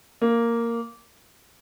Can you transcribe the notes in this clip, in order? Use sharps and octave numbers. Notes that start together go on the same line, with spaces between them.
A#3